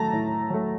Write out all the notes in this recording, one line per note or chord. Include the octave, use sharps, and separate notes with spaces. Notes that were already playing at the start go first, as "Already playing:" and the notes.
Already playing: F#3 A3 A5 A#5
A2
F#3 A3